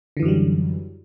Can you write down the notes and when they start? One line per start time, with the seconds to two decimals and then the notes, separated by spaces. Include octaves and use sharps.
0.17 D3
0.19 E3
0.22 F#2
0.25 F#3
0.28 G3